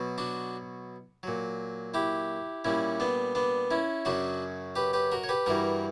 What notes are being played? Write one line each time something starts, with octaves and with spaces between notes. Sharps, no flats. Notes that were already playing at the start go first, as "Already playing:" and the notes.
Already playing: B2 F#3
D4 F#4
A#2 F#3
E4 G4
A#2 G3 C#4 E4
B3 D4
B3 D4
C#4 E4
F#2 C#3 F#3 D4 F#4
G4 B4
G4 B4
F#4 A#4
C#5
G4 B4
G2 E3 G3 F#4 A#4